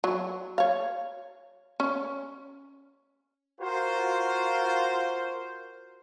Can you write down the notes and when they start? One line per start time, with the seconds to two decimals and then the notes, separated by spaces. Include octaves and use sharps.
0.04 F#3
0.58 C#5 F5
1.80 C#4
3.61 F4 F#4 A#4 C5